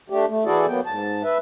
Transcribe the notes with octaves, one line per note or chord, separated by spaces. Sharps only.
A3 D4 G4
A3
E3 E4 F#4 G#4 A4 D5
F#3 A#3 B3 G5
G#2 A5
B4 E5